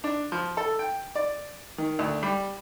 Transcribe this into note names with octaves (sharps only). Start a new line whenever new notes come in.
D4
F3
A4
G5
D5
D#3
D2
G3